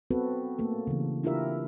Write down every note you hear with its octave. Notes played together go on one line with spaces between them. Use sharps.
B3 C4 F#4 A4 B4
A3 A#3 A4
C#3 E3
D4 E4 F4 G4 A#4 E5